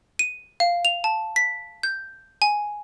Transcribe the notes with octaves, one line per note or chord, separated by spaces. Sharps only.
D#7
F5
F7
A5
B6
G6
G#5